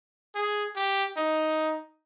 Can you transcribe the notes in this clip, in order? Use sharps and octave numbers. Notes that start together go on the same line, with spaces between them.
G#4
G4
D#4